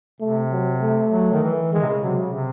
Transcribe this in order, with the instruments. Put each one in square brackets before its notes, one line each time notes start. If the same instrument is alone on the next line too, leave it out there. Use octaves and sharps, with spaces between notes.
[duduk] C3 [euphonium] A3
[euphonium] F#3
A3
[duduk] F#3
D#3
E3
[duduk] D#3 [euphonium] G#3
[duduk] C3
C#3
[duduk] C3 [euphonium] F#3
[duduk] C#3
C3